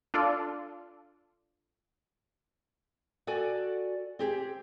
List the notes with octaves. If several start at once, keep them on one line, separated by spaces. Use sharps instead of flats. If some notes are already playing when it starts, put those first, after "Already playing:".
D4 F4 A4 D5
F#4 A4 D5 G#5
C4 G4 G#4